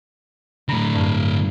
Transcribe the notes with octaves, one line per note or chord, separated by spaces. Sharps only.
A2 D3 A#5 B5 A#6
G2